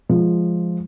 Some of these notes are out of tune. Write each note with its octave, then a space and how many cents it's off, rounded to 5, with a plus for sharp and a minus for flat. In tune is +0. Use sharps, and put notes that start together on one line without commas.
F3 -5 G#3 +0